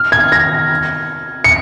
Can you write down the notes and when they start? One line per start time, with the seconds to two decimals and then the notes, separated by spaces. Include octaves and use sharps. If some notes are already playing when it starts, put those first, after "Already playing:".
Already playing: F6
0.12 G#6
0.32 A#6
1.44 C#7